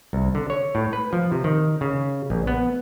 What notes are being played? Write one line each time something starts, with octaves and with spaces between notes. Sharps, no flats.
C2
D3
C#5
A2
B4
F3
C3
D#3
C#3
A#1
B3